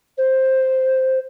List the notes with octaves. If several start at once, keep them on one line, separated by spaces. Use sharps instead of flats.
C5